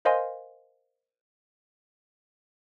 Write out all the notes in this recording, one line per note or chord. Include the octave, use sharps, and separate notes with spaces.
A#4 C5 D#5 F5 G#5 C6